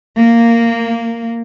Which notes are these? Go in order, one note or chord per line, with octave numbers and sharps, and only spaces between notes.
A#3